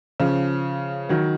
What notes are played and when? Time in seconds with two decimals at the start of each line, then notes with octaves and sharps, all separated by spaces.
0.20 C#3 F3
1.09 D#3 F#3